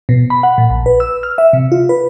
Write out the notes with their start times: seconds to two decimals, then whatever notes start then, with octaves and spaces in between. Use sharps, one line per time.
0.09 B2
0.30 B5
0.43 F#5
0.58 A#2
0.70 A#1
0.86 B4
1.00 E6
1.23 F6
1.38 E5
1.53 C3
1.72 F4
1.89 B4